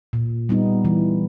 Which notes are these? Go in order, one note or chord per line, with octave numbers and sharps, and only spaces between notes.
A#2
G3 B3 D#4
E3